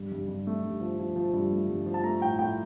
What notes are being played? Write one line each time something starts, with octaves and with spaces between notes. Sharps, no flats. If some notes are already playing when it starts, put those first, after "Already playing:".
Already playing: G2
G2
G2
A3
G2
F3
F3
F3
G2
A3
G2
F3
A5
A3 A#5
A2 G5
A2 G5